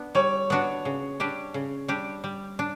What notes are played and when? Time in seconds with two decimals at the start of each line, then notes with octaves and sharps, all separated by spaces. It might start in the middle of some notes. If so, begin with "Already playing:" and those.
Already playing: B3 D4
0.15 G3 C#5
0.50 B3 D4 F#4
0.85 C#3
1.20 G3 D4 G4
1.54 C#3
1.88 G3 D4 G4
2.24 G3
2.59 D4